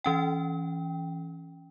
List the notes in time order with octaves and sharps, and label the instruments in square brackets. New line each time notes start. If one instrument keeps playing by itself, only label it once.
[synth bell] E3 C#4 G5